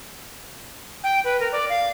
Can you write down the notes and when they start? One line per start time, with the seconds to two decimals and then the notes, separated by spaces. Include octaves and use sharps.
1.04 G5
1.24 B4
1.40 A#4
1.52 D5
1.69 F5